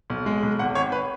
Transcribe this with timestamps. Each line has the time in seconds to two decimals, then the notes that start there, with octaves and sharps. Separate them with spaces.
0.10 B1
0.26 G#3
0.43 B1
0.59 G#1 F#5
0.75 G#1 C#5
0.92 B4